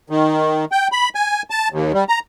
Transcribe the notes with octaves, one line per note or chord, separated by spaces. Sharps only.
D#3
G5
B5
G#5
A5
D#2
G3
A#5